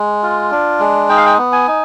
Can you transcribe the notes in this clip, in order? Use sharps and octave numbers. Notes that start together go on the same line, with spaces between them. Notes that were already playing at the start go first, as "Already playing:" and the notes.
Already playing: G#3
F4
D4
G#3
D#4 G5
F5
G5
B3
G#5
D#4